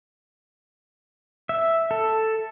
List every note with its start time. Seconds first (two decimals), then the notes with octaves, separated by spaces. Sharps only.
1.49 E5
1.91 A4